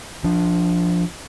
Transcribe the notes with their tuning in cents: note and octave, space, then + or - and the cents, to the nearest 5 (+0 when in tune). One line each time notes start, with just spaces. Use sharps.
F3 +0 D4 +0